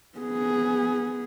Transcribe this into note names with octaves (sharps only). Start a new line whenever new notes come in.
B3 G#4